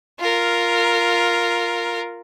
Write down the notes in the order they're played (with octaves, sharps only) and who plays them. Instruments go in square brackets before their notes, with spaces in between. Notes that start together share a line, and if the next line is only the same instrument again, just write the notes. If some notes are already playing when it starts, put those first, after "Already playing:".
[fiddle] F4 A#4